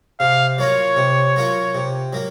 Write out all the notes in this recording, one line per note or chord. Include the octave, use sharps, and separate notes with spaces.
C3 F5
F#3 A#3 F4 C#5
C3
F#3 A#3 F4
C3
F#3 A#3